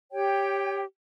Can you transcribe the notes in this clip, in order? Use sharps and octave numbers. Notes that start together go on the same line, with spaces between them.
G4 C#5 G5